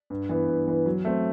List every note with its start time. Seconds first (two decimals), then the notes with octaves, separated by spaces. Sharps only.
0.10 G2
0.29 E3 B3
0.48 G2
0.67 E3 B3
0.86 F#3
1.05 A3 C4